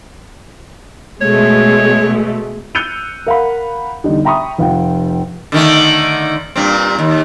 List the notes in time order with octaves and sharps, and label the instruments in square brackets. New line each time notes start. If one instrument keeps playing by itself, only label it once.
[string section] B2 G#3 A3 [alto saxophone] C#5
[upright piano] E6 F#6 G6 C#7 D#7 F7
A#4 F5 F#5 B5
E2 D3 G3 D4 D#4
E5 G5 A#5 B5 C#6 D#6
F1 F4 F#5 G5
[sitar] D3 D#3 A3
G2 A#2 C4
D#2